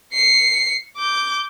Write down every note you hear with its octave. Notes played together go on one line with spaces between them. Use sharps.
C7 C#7
D6 G6